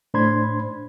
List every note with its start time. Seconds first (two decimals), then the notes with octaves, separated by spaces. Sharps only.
0.14 A2 D4 C5 B5 C6 G#6